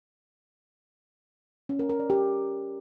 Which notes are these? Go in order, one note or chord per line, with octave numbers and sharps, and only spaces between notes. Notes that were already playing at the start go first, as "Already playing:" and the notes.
C#4
A#4
A#4
D5
G4